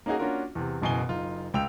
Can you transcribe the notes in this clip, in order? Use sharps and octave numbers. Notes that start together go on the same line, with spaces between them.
A#3 C#4 D#4 F#4 G#4
A#3 C#4 D4 F4 F#4 A#4
E2 C3
F#1 F#2 B2 E3 G#5 G7
F#1 D#4 F4
C#2 G5 E6 F7